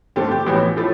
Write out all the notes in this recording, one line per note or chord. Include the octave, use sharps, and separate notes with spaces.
G2 D3 A3 C4 G4
G4
A1 A2 E3 B3
A2 F3 A3